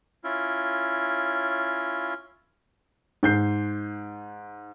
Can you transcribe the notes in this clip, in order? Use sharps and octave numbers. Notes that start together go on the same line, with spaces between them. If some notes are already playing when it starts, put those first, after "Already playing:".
C#4 E4 F4
G#2 G6 C7